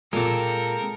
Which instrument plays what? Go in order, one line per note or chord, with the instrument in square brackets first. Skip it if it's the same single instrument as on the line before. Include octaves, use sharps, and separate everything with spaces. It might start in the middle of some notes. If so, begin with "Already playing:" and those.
[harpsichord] A#2 D6 [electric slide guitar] G#3 A#3 C4 [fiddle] A4 [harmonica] A#4